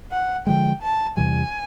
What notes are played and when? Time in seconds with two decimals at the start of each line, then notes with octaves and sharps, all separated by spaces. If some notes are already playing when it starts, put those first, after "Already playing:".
0.12 F#5
0.47 D3 F3 G#3 G5
0.82 A5
1.17 E2 C3 E3 G3 G#5